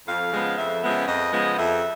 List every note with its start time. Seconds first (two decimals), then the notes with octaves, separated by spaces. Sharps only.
0.07 F2 F5
0.32 C#3 F3 G#3 B3
0.57 F2 E5
0.83 C#3 F3 G#3 B3
1.08 F2 D#5
1.33 C#3 F3 G#3 B3
1.58 F2 E5